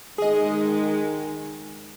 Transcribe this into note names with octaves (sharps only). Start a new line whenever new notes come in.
D#3 G#3 G#4 D#5